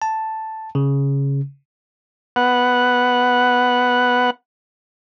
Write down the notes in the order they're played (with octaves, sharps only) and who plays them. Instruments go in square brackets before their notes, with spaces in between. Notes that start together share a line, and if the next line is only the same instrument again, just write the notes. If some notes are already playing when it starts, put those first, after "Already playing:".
[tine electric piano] A5
C#3
[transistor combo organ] B3 F#5